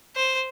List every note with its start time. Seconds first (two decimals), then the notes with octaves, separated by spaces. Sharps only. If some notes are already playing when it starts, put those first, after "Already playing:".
0.16 C5